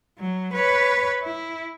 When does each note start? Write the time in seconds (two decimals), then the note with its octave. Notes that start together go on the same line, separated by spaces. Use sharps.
0.19 F#3
0.53 B4 C#5
1.23 E4